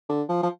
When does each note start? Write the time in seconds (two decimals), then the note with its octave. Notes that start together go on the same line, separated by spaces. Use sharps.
0.09 D3
0.29 F3
0.43 F3